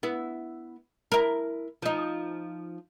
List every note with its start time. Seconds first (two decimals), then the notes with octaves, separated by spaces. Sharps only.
0.03 B3 E4
1.12 E4 A#4
1.82 F3 D#4